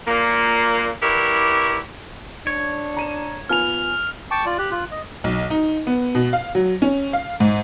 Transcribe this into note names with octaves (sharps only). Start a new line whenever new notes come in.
A#2 A#3
E3 E4 F#4 G4 A#4 D5
D4 C#5
A#5 D#7 E7
B3 F4 G#5 F6 F7
G5 A5 C#6 D6
F4 D5
G4 F#6
F4 F#6
D#5
B1
D#4
B3
B2
F5
F#3
C#4
F5
G#2